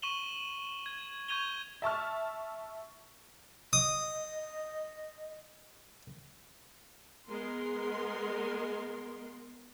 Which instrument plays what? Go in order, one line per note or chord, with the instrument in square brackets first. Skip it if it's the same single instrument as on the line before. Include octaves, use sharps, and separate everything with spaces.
[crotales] C#6 D#7 E7 F#7 G7
G#6
C#6 G6 G#6 D#7 F7 G7
[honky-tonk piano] E5 A5 C#6 F6
[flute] D#5 [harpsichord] D#6
[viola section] G#3 B3 A#4 C6